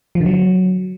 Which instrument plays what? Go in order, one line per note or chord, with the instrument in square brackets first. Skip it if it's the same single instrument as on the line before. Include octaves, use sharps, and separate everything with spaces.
[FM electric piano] F3
D3
F#3